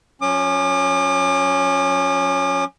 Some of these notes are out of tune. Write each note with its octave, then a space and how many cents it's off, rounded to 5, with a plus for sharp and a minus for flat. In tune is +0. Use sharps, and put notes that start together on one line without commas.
F3 +45 C#4 +0 D6 +40